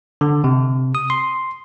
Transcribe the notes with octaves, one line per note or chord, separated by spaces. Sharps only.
D3
C3
D#6
C6